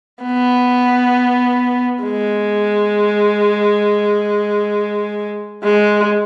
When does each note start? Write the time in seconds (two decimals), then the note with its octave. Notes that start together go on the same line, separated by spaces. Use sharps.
0.23 B3
2.03 G#3
5.64 G#3